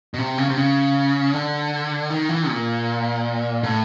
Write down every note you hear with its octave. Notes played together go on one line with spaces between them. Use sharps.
B2
C3
C#3
C3
C#3
D3
D#3
E3
A#2
A2